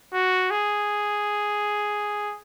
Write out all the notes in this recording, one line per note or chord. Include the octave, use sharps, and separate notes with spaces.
F#4
G#4